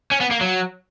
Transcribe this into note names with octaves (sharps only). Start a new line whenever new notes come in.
C#4
B3
A#3
F#3